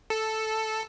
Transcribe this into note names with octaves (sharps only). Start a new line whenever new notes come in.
A4